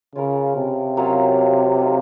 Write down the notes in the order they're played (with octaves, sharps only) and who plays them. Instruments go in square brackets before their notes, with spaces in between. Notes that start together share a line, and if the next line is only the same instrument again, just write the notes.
[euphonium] C#3 [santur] C#4 F4 A#4
[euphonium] C3
[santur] F#3 A#3 C#4 F4
A3 D#4 A4